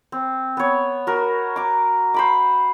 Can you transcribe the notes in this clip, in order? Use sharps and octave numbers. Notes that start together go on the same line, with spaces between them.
C4
B3 C#5
F#4 A#4
A#5 D6
C5 B5 D6